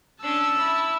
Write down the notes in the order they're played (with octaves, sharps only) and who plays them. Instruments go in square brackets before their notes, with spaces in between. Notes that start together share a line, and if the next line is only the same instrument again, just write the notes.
[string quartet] C#4 D4 [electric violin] A5 E6
[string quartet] E4